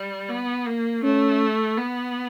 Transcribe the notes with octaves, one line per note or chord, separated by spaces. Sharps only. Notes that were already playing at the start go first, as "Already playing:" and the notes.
Already playing: G3
B3
A#3
A3 C#4
B3